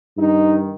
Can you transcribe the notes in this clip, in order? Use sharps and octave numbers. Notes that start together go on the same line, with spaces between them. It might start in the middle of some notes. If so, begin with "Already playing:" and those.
G2 D#3 D#4